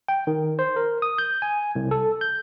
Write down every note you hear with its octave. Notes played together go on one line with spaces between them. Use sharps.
G5
D#3
C5
A#4
D#6
G6
G#5
C2
A4
G6